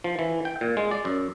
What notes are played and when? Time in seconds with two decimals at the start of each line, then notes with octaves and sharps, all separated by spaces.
0.04 F3
0.19 E3
0.45 G5
0.61 A#2
0.77 G#3
0.91 D5
1.05 F#2